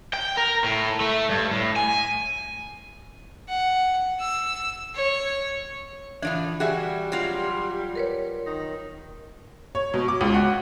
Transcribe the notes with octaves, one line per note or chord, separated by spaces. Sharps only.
G5
A#4
A2
A3
G2
A2
G#5
F#5
E6
C#5
A2 E3 F3 D4
G3 F#4 G#4 E5
F#3 C4 F4
A#4 B4 C#5
D#3
C#5
B2
D6
C#2
F#4